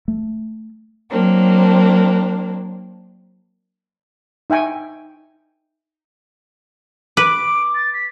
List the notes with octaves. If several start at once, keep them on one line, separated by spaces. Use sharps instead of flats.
A3
F#3 A#3 C4 D4
D#4 E5 G5 G#5 C#6
B4 D6 D7
A6
B6